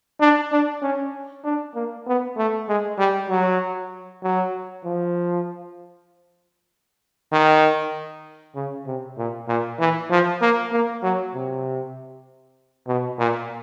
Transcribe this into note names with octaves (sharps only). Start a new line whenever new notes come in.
D4
D4
C#4
D4
A#3
B3
A3
G#3
G3
F#3
F#3
F3
D#3
C#3
C3
A#2
A#2
E3
F3
A#3
A#3
F#3
C3
B2
A#2